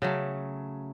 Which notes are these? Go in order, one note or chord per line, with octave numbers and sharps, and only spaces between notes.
C#3 F#3 A3